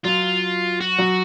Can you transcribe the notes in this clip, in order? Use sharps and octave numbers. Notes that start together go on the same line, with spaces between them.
F#3 F4
F#4
F#3